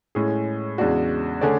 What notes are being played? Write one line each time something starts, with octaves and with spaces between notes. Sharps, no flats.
A2 G#3 C#4 G#4
E2 C#3 G#3 D4 F#4
D3 A3 C#4 G#4 D5